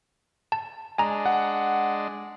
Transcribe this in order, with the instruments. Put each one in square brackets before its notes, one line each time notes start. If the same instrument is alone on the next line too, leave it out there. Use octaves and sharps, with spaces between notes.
[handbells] A5
[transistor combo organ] G#3 D4 [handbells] G#5 A#5
[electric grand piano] F#5